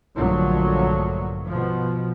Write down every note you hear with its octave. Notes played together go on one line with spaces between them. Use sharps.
A#1 G2 D3 F3 F#3 A3
B2 F3